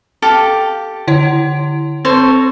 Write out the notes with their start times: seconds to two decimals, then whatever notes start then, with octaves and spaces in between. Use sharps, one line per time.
0.22 G4 A4 F5
1.07 D3 E4 C#5
2.05 C4 A4 C5 C#5